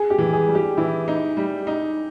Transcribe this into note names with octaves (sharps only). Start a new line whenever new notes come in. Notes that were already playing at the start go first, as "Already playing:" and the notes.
Already playing: G#4
G4
E3
G#4
G3
G4
E3 E4
D#4
G3
D#4